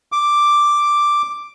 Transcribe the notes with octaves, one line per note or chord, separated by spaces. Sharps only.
D6